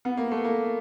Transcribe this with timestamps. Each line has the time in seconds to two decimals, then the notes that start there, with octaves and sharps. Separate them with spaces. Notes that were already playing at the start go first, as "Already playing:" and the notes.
0.05 B3
0.17 A#3
0.31 A3
0.44 A#3